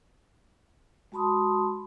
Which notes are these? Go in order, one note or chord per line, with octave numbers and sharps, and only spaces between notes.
G#3 F#4 A5 B5 C6 D#6